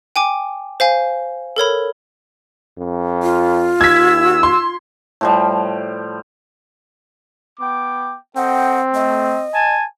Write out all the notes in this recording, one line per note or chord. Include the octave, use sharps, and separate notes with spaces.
G5 G#5 D6
C5 F5 G#5
A4 A#4 C#5 B5
F2
F4
D#2 E6 G#6 B6
C6
A2 F3 G3
B3 G5 D6
C4 A4 D#5 F#5 G5
A3 D#5
G#5 A5